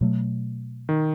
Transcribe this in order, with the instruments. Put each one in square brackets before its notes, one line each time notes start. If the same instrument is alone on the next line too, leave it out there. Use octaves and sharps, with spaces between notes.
[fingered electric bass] B2 F#3 A3
[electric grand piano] D#3